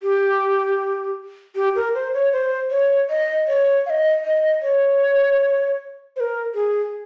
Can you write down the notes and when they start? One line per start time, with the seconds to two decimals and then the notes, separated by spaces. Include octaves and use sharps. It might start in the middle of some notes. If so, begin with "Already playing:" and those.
0.03 G4
1.56 G4
1.75 A#4
1.94 C5
2.14 C#5
2.32 C5
2.71 C#5
3.10 D#5
3.48 C#5
3.86 F5
3.90 D#5
4.24 D#5
4.62 C#5
6.16 C5
6.20 A#4
6.54 G#4